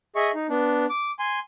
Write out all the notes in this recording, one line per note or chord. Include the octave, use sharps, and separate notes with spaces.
G#4 D#5 E5 C#6
D#4
B3 D4
D6
G#5 C6